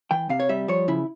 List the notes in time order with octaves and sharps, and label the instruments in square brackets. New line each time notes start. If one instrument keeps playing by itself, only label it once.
[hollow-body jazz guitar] E3 G5
C3 F5
C#5
G3 E5
F3 C#5
C#3 E4